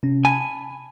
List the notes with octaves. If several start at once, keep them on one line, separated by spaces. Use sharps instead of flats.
C3 C#4
G#5 A5 B5